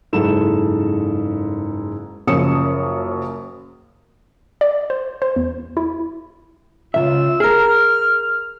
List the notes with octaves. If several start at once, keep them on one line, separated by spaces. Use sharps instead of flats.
F#1 G#2 E4 A4 E7
F#1 F#2 F3 D#6 C#7 E7
D5
C5
C5
E2
E4
C#2 D#3 F4 E5 E6
G#4 A#4 F6